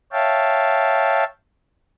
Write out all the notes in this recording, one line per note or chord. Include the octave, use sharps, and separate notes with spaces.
C#5 E5 F5 G5 A5